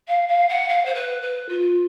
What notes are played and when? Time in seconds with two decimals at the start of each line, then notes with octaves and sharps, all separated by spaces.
0.08 F5
0.28 F5
0.49 F#5
0.69 F5
0.85 C5
0.95 B4
1.22 B4
1.49 F4